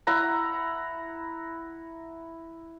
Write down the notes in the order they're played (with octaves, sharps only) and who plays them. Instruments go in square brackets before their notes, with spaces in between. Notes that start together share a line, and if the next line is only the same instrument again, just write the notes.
[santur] E4 F#5 A#5